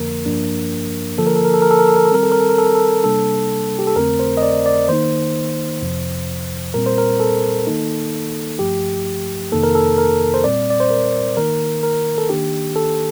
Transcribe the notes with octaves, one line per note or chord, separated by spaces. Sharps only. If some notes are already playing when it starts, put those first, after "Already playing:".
Already playing: F2 D3 F3 A#3 A#4
G2 F3 A#3 D4
D3 F3 A#3 A4
A#4
A4
A#4
A4
A#4
A4
A#4
A4
A#4
A4
D#3 G3 C4 A#4
A4
A#4
A4
A#4
A4
A#4
A4
C3 G3 A#3 D4 A4
G4
A4
F2 D3 A3 C4 A#4
C5
D#5
D5
D5
D#3 A#3 D#4 C5
F2 C3 F3
A#2 G3 C4 A#4
C5
A#4
A4
D#3 A#3 D#4
G2 F3 A3 G4
F2 C3 D#3 A#3 D#4 A4
A#4
A4
A#4
C5
A#2 G3 C4 D5
D5
C5
A#4
D#3 A#3 D#4 A#4
A#4
A4
D#3 A#3 D4 G4
A4